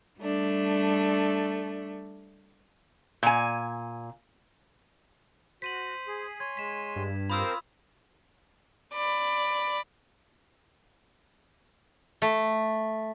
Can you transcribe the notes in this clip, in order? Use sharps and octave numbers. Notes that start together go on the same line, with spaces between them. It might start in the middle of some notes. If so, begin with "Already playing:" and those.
G3 A3 D4
A#2 G#5
F#4 C5 B6 D#7 F#7
G#4
C#5 G#5 C6 G#6
G#3 B6 E7
G2
C4 F4 A#4 C5 B5 D#6 E6
D5 B5
A3